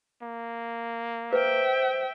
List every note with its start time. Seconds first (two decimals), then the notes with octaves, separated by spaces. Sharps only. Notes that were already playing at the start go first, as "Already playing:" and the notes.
0.22 A#3
1.33 B4 C5 E5 G5